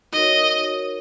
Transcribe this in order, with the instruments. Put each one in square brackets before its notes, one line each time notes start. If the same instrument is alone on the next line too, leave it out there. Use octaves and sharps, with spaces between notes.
[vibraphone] D#4 F#4 A#4 C#5 [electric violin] D#5